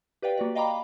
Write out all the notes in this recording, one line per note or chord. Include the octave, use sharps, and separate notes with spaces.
G4 B4 D5 F5 G5
A#3 F#4 D5
D#5 F5 G5 A#5 B5 D6